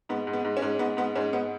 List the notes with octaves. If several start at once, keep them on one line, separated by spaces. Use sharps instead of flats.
G#2 B3
G#2
B3
G#2
C#4
G#2
G#2 B3
G#2 B3
G#2 C#4
G#2 B3